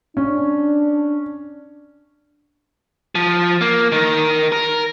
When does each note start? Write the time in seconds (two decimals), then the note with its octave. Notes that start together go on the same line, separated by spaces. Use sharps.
0.17 C#4 D4
3.15 F3
3.61 A#3
3.92 D#3 A#4
4.52 A#4